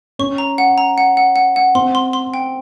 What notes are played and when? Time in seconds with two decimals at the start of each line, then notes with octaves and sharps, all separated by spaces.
0.19 C#4 C#6
0.38 A#5
0.58 F#5
0.78 A#5
0.98 F#5
1.17 F#5
1.36 F#5
1.56 F#5
1.75 C4 C6
1.95 C6
2.13 C6
2.34 G5